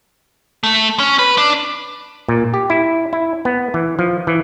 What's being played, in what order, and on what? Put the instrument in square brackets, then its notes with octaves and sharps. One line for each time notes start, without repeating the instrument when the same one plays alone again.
[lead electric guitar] A3
C#4
B4
D4
[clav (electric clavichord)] A#2
G4
E4
E4
B3
E3
F3
E3